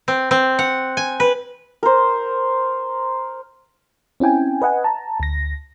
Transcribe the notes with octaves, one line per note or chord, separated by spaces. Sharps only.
C4
C4
F#5
G#5
B4
A#4 C5
C4 C#4 E4 G5 G#5
B4 D#5 F#5 G#5
A5 A#5
D2 A#6